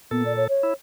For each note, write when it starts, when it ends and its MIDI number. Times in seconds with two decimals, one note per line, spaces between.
0.11 0.47 46
0.11 0.23 59
0.11 0.47 69
0.26 0.33 74
0.37 0.44 73
0.49 0.72 73
0.63 0.74 64